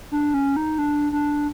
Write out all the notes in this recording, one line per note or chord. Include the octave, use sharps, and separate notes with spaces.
D4
C#4
D#4
D4
D4